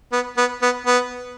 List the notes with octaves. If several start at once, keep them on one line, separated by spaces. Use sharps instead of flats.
B3
B3
B3
B3